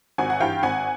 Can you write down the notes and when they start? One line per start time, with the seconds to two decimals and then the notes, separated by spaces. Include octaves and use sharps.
0.18 G#1 F#5 G#5
0.30 F#5
0.40 G2 E3 F5 G5
0.63 G#1 F#5 G#5